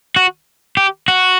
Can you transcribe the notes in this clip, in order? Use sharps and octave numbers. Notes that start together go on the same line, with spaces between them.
F#4
G4
F#4